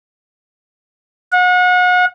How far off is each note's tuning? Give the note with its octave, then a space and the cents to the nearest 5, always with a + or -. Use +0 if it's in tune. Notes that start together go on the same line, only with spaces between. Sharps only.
F#5 -35